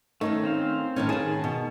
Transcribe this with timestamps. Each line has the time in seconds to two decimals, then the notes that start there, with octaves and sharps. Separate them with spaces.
0.21 D#3 A3 C#4 D#4
0.43 C4 C5 F5
0.96 A2 D#3 C#4
1.09 D#3 G#4 B4 A5
1.44 B2